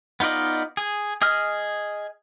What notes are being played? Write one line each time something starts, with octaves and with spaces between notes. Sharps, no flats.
B3 D#4 F4 D5 D#5
G#4
G#4 D#5 D#6 F6